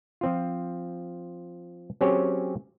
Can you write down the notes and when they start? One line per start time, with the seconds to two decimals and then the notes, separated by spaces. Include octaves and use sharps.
0.21 F3 C4 F4
2.01 F#3 C4 C#4 G4 G#4 C#5